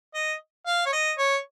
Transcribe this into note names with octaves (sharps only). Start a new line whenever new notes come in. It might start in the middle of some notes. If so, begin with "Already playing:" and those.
D#5
F5
C#5
D#5
C#5